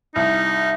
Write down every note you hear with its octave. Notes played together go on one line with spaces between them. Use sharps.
C2 D#4